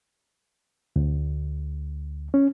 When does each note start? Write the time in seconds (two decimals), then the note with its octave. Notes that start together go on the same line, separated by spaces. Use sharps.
0.96 D2
2.34 C#4